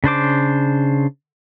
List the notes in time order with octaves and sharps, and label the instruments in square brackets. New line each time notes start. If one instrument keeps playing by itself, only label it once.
[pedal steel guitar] C#3 D4 C5 D6